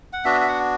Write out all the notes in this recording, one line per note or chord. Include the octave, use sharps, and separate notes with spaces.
F#5
B3 D4 F#4 E5
E5
F#5